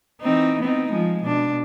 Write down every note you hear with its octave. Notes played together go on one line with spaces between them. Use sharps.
E3 C4 D#4
B3 C4 D#4
F3 G#3
B2 D4